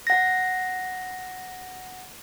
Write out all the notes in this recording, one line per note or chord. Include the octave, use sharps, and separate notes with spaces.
F#5 A#6